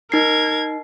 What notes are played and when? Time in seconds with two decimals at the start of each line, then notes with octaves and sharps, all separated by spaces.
0.12 D#4 A#4 G#6 C7